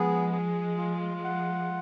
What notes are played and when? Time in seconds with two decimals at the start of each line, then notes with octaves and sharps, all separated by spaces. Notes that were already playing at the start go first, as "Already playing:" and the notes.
Already playing: F3 G#3 B3 G#4
0.32 G#4
0.78 F4
1.24 F#5